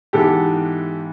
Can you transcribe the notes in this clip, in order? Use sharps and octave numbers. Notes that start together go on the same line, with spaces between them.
G#2 E3 G#3 B3 G4 A4